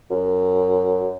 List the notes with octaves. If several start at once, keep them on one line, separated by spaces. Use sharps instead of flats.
F#2